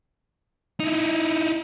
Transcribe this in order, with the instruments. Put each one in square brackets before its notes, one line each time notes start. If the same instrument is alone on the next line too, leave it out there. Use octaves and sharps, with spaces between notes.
[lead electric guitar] D#4 E4